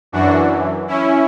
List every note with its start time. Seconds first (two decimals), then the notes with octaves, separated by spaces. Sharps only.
0.12 F#2 E3 D4 F#4
0.87 C#4 E4